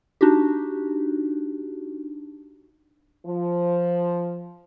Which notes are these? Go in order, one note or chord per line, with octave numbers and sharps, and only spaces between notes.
D4 D#4 F#4 G4
F3